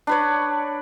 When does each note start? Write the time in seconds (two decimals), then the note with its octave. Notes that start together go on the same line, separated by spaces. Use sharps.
0.07 D4 B4 C#5